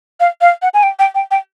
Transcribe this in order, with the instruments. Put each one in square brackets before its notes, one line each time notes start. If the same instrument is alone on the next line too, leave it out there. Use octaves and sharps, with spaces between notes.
[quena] F5
F5
F#5
G#5
G5
G5
G5
G5